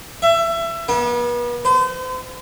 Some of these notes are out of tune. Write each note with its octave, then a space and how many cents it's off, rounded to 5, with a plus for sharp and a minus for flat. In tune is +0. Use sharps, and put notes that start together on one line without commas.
E5 +25
B3 -40
C5 -40